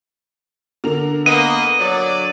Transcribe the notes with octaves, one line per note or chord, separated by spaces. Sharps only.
D3 A#4 F7
A#3 B3 D#5 D#7
F#3 D5